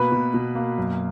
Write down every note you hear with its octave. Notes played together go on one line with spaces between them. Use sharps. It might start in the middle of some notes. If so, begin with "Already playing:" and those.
Already playing: B2 A#3 B4 B5
B2
B2
A#3
F#2